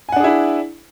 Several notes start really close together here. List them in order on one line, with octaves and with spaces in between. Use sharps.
G#5 F#5 D4 G#4 E4